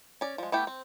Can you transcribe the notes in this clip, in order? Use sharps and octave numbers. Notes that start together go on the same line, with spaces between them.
C#4 D5
F3 G#3
A3 B3 E4 G4 G5
C4